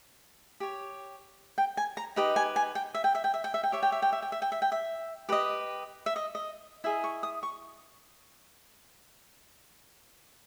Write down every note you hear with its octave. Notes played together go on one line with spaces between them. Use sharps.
G4 C#5
G5
G#5
A#5
D#4 G4 B4 D#5
G#5
G#5
G5
E5
G5
E5
G5
E5
G5
E5
G5
G4 C#5 E5
G5
E5
G5
E5
G5
E5
G5
E5
G5
E5
G4 B4 D#5
E5
D#5
D#5
E4 G#4 D#5 E5
C#6
D#6
C#6